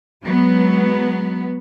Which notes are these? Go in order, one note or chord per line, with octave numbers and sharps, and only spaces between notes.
F#3 G#3 B3